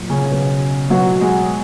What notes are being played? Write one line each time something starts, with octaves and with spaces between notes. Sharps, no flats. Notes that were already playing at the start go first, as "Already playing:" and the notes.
Already playing: A#2 F#3
C#3 C#4
B2 F#3
B2 F#3 F#4
G#3 G#4